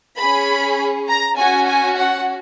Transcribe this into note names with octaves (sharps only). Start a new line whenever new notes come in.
C#4 G#4 B5
A#5
C#4 F#4 G#5
G#5
F#5